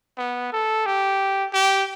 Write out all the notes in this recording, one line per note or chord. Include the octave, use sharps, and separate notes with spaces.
B3
A4
G4
G4